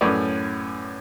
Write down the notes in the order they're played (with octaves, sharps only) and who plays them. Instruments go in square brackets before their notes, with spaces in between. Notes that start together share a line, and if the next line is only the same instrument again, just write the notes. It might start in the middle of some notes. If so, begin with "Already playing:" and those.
[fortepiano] F#2 A2 C#4 B4 C#5 D5